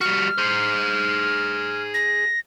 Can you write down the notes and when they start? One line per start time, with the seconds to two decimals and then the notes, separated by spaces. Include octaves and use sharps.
0.01 G3 F#4 F6
0.38 G#4 C5
1.94 A#6